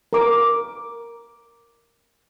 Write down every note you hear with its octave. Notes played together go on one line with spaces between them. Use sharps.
A#4 D6